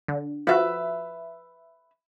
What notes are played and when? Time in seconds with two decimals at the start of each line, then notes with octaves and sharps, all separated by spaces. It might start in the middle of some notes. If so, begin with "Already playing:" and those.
0.08 D3
0.47 F3 F#4 B4 E5